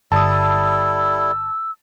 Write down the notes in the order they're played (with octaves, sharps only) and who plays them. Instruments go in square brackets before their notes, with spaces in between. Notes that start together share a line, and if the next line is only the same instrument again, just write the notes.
[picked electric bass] G1 [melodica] G3 E4 A4 [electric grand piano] A5 D#6 [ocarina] E6